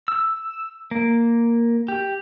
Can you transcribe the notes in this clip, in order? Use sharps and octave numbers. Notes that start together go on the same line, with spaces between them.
E6
A#3
G4